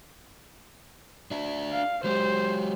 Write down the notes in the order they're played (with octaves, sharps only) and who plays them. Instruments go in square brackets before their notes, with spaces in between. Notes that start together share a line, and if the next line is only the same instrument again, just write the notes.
[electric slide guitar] D4 E5
[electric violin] F5
[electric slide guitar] F#3 G#3 G4 [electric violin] C5